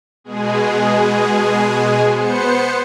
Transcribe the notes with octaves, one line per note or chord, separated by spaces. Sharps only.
B2 G#3 G#4
B3 C5 C#7